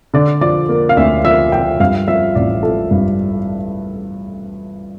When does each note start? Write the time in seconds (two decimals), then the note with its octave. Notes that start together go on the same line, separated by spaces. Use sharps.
0.14 D3 D5
0.41 F3 D5
0.69 A#3
0.89 F5
0.97 D2 E5
1.25 F3 E5
1.52 F3 G5
1.80 G2 F5
2.08 F3 E5
2.35 A1 D5
2.63 F3 A4
2.91 G2